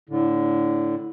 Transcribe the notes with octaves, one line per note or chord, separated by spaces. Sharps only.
A2 D3